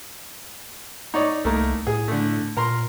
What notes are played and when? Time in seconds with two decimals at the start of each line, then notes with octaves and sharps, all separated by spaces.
1.14 D#4 C#5 D5
1.45 C2 A3 A#3 D#4
1.87 A2 G#4
2.08 D3 A3
2.57 A#2 A#4 A#5 C6